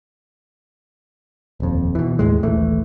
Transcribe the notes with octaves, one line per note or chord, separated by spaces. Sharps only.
D#1 F2
B2 E3
D#2 A2 G#3
D#1 A#1 E3 A3